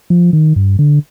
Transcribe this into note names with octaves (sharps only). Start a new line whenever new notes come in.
F3
D#3
G2
D3